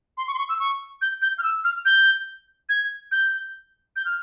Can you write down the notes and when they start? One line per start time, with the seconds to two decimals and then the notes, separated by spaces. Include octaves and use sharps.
0.17 C6
0.28 C#6
0.34 C6
0.39 C#6
0.49 E6
0.60 C#6
1.02 G6
1.22 G6
1.38 F6
1.43 E6
1.64 F6
1.85 G6
2.69 G#6
3.12 G6
3.96 G6
4.05 F6